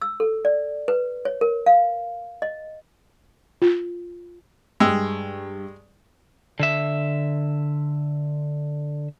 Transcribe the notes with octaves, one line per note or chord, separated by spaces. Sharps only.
E6
A4
D5
B4
C#5
A#4
F5
D#5
F4
G2 G#3 G5 E6
D3 E5